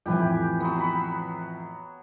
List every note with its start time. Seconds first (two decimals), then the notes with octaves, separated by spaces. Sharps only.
0.06 F2 A2 E3 G4 B4 G#5
0.60 F#3 B3
0.79 B5